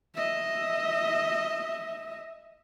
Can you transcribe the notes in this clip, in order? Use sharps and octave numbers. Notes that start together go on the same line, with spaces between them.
D#5 E5